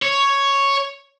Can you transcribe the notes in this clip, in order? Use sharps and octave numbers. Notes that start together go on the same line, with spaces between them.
C#5